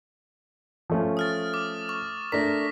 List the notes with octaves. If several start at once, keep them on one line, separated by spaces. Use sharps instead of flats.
F3 A3 C#4
D#6 F6 A6
D6
C#6
A3 D4 A#4 A#6 B6